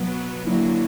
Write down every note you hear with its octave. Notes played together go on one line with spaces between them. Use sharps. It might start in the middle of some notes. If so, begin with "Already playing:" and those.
Already playing: B2 F#3 B3
D3 F#3 A#3 E4